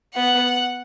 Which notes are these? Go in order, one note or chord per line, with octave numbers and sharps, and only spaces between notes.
B3 F#5